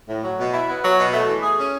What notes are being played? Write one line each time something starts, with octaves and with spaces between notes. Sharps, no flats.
A2
F#3
B2
E4
B3
F#3
B2
A3
E3
G#4
C#4